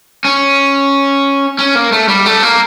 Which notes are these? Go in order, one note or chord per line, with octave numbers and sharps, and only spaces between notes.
C#4
C#4
A#3
A3
G3
A3
A#3